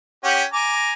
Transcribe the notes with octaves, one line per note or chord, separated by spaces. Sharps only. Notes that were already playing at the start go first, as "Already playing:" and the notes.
C#4 G4 F#5
G#5 A#5 D6